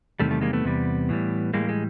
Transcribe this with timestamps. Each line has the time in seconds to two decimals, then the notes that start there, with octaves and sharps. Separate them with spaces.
0.20 E2 C3 D#3 G3 A3
0.31 A3
0.41 G#3 A#3
0.53 A3 B3
0.65 E2 C3 G3
1.09 A2 E3 G3
1.53 A2 E3 G3 G#3 A#3
1.69 G#3